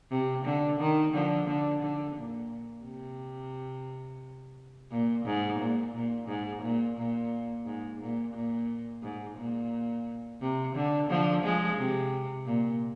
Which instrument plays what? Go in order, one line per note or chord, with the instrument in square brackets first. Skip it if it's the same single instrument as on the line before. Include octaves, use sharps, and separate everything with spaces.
[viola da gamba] C3
D3
D#3
D3 F3
D3
D3
A#2
C3
A#2
G#2
A#2
A#2
G#2
A#2
A#2
G#2
A#2
A#2
G#2
A#2
C3
D3
D3 F3
F3 G#3
C3
A#2